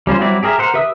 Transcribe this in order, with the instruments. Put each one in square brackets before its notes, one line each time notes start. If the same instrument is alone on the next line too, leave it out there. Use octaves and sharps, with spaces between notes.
[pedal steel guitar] G3 C#4 F4 C5
F#3 G3 C4 E4 D5
G4 G#4 A#4 C5 E5
A#4 C5 F#5
G4 B4 E5 D#6 E6